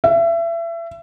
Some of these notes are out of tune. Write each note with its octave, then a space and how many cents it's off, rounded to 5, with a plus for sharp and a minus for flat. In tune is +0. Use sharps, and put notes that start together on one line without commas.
E5 +30